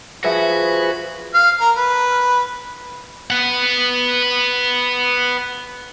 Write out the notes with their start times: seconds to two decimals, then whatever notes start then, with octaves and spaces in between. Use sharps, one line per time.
0.24 F3 F#4 G#4 B4 E5
1.34 F5
1.60 A#4
1.77 B4
3.30 B4 F#5